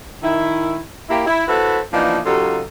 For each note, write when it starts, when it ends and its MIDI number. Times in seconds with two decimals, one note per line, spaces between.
0.23 0.78 51
0.23 0.78 64
1.09 1.23 58
1.09 1.23 64
1.09 1.23 67
1.26 1.43 64
1.48 1.78 64
1.48 1.78 66
1.48 1.78 69
1.48 1.78 71
1.48 1.78 72
1.48 1.78 76
1.93 2.18 52
1.93 2.18 53
1.93 2.18 58
1.93 2.18 59
1.93 2.18 62
1.93 2.18 63
2.26 2.60 49
2.26 2.60 54
2.26 2.60 63
2.26 2.60 65
2.26 2.60 67
2.26 2.60 69